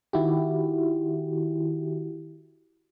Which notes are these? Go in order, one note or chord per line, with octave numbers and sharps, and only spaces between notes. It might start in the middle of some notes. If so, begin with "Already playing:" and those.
D#3 E4 F#4 G4